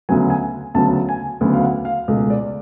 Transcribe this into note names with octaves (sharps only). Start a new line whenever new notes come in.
D2 C#3 F#3 B3 G#5
G#5
D2 C#3 F#3 B3 A5
G#5
D2 C#3 F#3 B3
F5
F#5
F5
C#2 B2 A3
D5